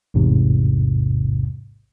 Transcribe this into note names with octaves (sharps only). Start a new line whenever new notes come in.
A1 E2 G#2 C3